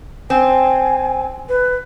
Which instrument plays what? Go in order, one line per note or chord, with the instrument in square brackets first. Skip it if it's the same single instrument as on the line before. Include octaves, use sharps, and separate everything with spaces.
[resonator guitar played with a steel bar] C4 [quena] G#5
[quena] B4